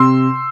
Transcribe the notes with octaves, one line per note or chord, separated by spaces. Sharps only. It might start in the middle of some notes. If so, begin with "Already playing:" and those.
Already playing: C3 C6 E6